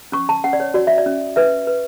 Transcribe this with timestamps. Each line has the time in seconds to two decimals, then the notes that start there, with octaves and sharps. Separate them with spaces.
0.12 C#4 C#6
0.29 A5
0.44 C#4 F#5
0.53 D5
0.60 C#5
0.74 F#4 D5
0.87 E5
0.98 D5
1.06 C#4
1.36 B4 E5
1.67 B4